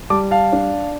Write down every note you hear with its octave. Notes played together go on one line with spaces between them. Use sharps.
G3 A5 D6
F5 A5
D4